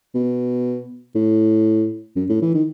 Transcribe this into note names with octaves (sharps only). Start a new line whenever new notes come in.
B2
A2
F#2
A2
E3
D#3